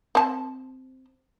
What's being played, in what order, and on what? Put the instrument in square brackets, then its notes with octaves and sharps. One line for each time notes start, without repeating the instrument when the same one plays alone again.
[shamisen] C4 A5